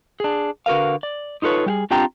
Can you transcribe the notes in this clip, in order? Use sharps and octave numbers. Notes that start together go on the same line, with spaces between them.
D4 G#4
D3 F#4 A#4 B4 F5
D5
D#4 F4 A4 B4 C#5
G3 G4 G#4
C4 D4 F4 G4 G5 A#5